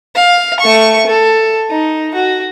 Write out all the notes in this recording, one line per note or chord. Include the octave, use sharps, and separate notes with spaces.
F5
A3 C#6
A4
D#4
F#4